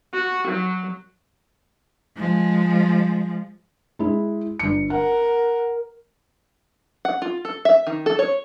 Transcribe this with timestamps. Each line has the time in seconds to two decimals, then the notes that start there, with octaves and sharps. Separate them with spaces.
0.13 F#4
0.47 F#3
2.17 F3 G#3
3.99 G#3 E4
4.59 G1 C#7
4.90 A#4 F#5
7.05 F#5
7.22 F4
7.45 A4
7.65 E5
7.87 D#3
8.06 A4
8.19 C#5